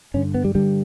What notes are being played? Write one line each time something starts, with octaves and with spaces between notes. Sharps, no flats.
G2 D3 C#4
B3
G3
G2 D3 G3